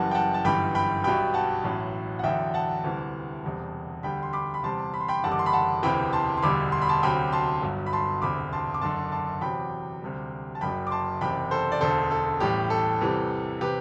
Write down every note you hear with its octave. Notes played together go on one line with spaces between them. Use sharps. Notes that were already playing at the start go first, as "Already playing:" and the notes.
Already playing: F#1 F#2 E3 G3 F#5 A5
G5
F#5 A5
A5
G1 F#2 E3 G3 G5 B5
G5 B5
B1 B2 G3 G5 B5
F#5 A5
A1 A2 F#3
F#5
E2 D3 F#3 E5 G5
F#5 A5
D2 C3 E3 G3
E1 E2 C3 G3
D2 D3 G3 G5 B5
C6
B5 D6
B5
E2 C3 G3 A5 C6
B5
C6
G5 B5
F#1 E2 D3 G3 F#5 A5
D6
C6
B5
F#5 A5
E1 D2 C3 E3 G5 B5
A5 C6
C6
E1 D2 D3 G3 B5 D6
C6
B5
A5 C6
D2 C3 F#3 G5 B5
A5 C6
G1 G2 F#3
B5
A5 C6
E1 D2 C3 B5 D6
A5 C6
D6
F#1 F#2 D3 A5 C6
A5 C6
E2 C3 F#3 G5 B5
D2 C3 G3
A5
F#1 F#2 F#3 G5 B5
D6
A5 C6
F#1 E2 C3 G5 B5
A4 C5
D5
E1 D2 D3 A4 C5
A4
A1 A2 G3 G4
A4
E2 C3 E3 G3
C3 E3 G4 B4